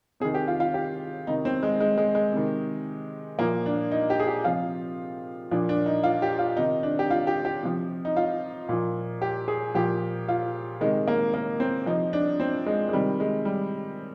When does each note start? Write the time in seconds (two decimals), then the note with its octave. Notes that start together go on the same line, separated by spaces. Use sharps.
0.20 C3 G#4
0.25 D#3
0.34 G4
0.48 F4
0.60 F4
0.74 G4
1.27 C3 D#3 D#4
1.45 C4
1.63 G#3
1.80 G#3
1.97 G#3
2.15 G#3
2.33 C3 D#3
3.39 A#2 F3 A#3
3.66 D4
3.92 D#4
4.10 G4
4.19 G#4
4.27 G4
4.44 C3 F3 F4
5.51 A#2 F3 D4
5.69 D4
5.86 D#4
6.03 F4
6.22 G4
6.39 F4
6.57 C3 D#3 D#4
6.83 D4
6.99 G4
7.10 F4
7.27 G4
7.45 G4
7.63 C3 F3
8.05 D#4
8.16 F4
8.69 A#2 F3
9.22 G4
9.48 G#4
9.75 A#2 F3 G4
10.28 F4
10.81 C3 D#3 G#3
11.08 A#3
11.34 A#3
11.60 C4
11.86 C3 F3 D#4
12.13 D4
12.40 C4
12.66 G#3
12.89 G#3
12.93 C3 D#3 G3
13.20 G#3
13.45 G3